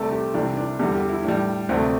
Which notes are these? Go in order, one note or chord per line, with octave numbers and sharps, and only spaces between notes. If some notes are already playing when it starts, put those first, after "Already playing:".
Already playing: C2 C3 A3 A4
G4
C2 C3 E3 G3 D4
D4
E2 D3 G3 G4
G4
E4
A2 G3 D4
D2 C3 A3 C4